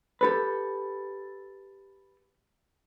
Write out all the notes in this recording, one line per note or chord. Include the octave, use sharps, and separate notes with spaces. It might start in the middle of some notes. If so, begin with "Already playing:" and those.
G4 A4 B4